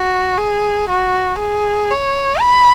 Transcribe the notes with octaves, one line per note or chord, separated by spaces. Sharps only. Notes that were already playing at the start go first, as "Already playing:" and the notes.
Already playing: F#4
G#4
F#4
G#4
C#5
B5